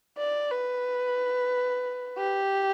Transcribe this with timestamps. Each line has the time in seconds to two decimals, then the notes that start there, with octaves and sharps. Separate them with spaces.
0.18 D5
0.51 B4
2.17 G4